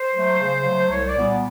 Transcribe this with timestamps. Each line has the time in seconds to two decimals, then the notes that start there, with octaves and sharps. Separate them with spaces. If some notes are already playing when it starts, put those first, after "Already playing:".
Already playing: C5
0.14 F#3 A3
0.40 C#3
0.65 F#3 A3
0.90 C2 C#5
1.07 D5
1.16 A#2 G3 B3